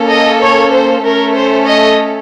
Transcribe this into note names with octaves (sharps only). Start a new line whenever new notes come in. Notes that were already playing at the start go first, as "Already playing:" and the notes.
Already playing: A#3 C#4 A4
D#5
C#5
C5
A3 C#4 A4 A#4
C5
D#5